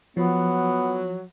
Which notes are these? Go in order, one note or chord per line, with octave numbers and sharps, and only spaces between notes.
F3 F#3 B3